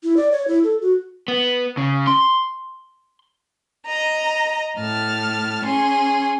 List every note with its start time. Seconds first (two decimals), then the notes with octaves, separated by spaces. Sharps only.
0.04 E4
0.17 D5
0.32 C#5
0.48 E4
0.64 A4
0.81 F#4
1.28 B3
1.77 C#3
2.07 C6
3.86 D#5 A#5
4.78 A2 A5 F6
5.65 C#4 G#4 C6